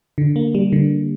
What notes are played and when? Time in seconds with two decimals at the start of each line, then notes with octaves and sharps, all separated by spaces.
0.18 D3
0.36 A#3
0.55 G3
0.72 D3